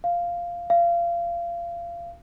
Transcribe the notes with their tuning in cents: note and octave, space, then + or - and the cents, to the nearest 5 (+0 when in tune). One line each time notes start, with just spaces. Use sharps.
F5 -5
F5 -25